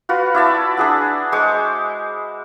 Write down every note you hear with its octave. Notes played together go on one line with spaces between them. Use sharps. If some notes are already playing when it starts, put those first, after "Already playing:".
F4 F#4 B4
E4 D5 E5 A5
D4 G#4 F#5
G#3 C5 C#6 D6